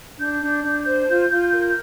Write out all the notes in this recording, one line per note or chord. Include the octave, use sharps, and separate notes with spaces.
D4 G6
D4
D4
C5
F4
F4
A#4